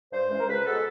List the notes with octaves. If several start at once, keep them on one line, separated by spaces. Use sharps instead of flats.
G2 C5
E3 G#3 C#4
A#4
C#2 B4
B2 G#3 B3 A4